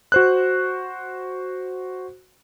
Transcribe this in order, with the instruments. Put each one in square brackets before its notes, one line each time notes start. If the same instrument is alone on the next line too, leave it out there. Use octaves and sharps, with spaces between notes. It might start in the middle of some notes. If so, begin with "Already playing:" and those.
[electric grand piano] F#4 C5 F#6